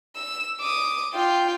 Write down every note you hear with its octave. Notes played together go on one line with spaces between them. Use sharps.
E6
D6 D#6
F4 G5